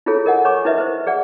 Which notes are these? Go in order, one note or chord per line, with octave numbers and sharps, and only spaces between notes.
E4 F4 G#4 A4 C#5
A#4 D#5 F#5 G#5
C#5 G#5 A#5 C#6 D6
E4 A#4 B4 D#5 E5
B4 C5
G#4 D5 F#5